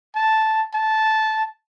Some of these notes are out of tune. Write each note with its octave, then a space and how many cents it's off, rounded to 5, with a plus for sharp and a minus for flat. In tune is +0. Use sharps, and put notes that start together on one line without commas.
A5 -5
A5 -10